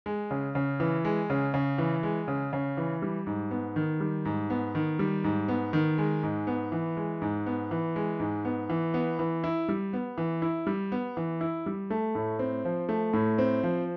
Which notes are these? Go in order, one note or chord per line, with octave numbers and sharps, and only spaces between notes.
G#3
C#3
C#3
E3
G#3
C#3
C#3
E3
G#3
C#3
C#3
E3
G3
G#2
B3
D#3
G3
G#2
B3
D#3
G3
G#2
B3
D#3
G#3
G#2
B3
E3
G#3
G#2
B3
E3
G#3
G#2
B3
E3
B3
E3
E4
G3
B3
E3
E4
G3
B3
E3
E4
G3
A3
A2
C4
F3
A3
A2
C4
F3